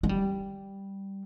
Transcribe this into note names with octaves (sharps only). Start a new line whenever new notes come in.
G#3
G3